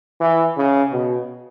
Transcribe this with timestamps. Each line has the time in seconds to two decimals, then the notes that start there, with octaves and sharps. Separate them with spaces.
0.21 E3
0.57 C#3
0.92 B2